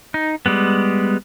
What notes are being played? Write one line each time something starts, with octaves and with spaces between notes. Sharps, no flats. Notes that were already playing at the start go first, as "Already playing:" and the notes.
D#4
G3 G#3 B3